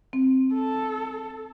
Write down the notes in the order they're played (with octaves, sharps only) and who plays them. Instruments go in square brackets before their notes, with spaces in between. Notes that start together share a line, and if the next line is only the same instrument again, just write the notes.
[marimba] C4
[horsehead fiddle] A4